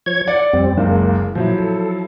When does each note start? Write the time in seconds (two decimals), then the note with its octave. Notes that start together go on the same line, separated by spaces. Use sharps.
0.06 F3 C#5 G#6
0.28 D5 F#5
0.53 F2 G3 C4
0.78 F#1 C#2 A#3
1.35 A#2 F3 F#3 E4
1.58 A4